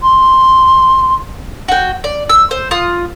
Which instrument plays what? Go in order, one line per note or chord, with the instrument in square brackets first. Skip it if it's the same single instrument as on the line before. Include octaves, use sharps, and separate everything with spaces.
[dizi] C6
[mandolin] F#4 G5
D5
E6
C5
F4 D#6